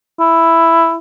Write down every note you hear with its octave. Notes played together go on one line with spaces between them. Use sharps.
E4